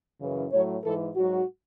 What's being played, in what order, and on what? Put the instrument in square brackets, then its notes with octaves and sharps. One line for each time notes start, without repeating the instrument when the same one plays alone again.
[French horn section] F#2 C#3 E3
A2 F#3 C#5
G#2 E3 A4
G#2 F#3 F#4